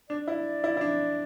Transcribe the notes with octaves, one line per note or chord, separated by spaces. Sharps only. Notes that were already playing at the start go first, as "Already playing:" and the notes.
D4 D5
E4
E4
E4
D4